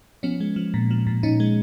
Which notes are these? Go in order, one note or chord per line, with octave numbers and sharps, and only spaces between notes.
F3 B3 C#4
G#3
F3
A#2
F3
A#2
A#2 C#4 D#4
G#3